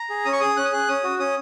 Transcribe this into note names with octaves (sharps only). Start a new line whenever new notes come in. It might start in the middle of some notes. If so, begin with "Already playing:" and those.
Already playing: A#5
G#4
C#4 D#6
C#6
G#4 D#6
C#4 F#6
D#6
G#4 F#6
C#4 D#6
F#4
C#4 D#6